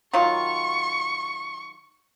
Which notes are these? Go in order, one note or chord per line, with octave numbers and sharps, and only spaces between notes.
D#3 F#3 F4 C#6